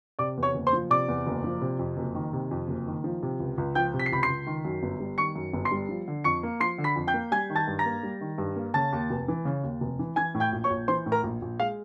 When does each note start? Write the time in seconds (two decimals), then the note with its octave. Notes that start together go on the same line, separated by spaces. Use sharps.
0.19 C3 D5 D6
0.37 E2
0.43 C#5 C#6
0.54 F#1
0.67 C5 C6
0.73 F3
0.90 C3 D5 D6
1.08 E2
1.27 F#1
1.44 F3
1.61 C3
1.79 F2
1.97 F#1
2.15 D#3
2.33 C3
2.51 F2
2.68 F#1
2.87 D#3
3.04 F3
3.23 C3
3.40 C#2
3.58 C#2
3.75 F3 G5 G6
3.94 C3
3.99 B6
4.06 C7
4.12 C#2 B5 B6
4.23 C6 C7
4.28 C#2
4.47 D#3
4.65 F#2
4.83 G1
5.00 G3
5.18 D#3 C#6 C#7
5.35 F#2
5.53 G1
5.65 C6 C7
5.71 G3
5.89 F3
6.08 D3
6.24 F2 C#6 C#7
6.43 A#3
6.60 F3 C6 C7
6.78 D3
6.84 B5 B6
6.96 F2
7.07 G5 G6
7.14 A#3
7.32 G3 G#5 G#6
7.50 D#3
7.55 A5 A6
7.67 G2
7.79 A#5 A#6
7.86 A#3
8.03 G3
8.21 D#3
8.38 G2
8.56 A#3
8.74 C#3 A5 A6
8.93 D#2
9.10 F1
9.28 E3
9.45 C#3
9.63 D#2
9.81 F1
9.99 E3
10.16 E3 G#5 G#6
10.34 A2
10.40 G5 G6
10.53 A#1
10.64 C#5 C#6
10.70 A#1
10.88 E3 C5 C6
11.06 A2
11.12 A#4 A#5
11.24 A#1
11.42 A#1
11.59 G#3 F5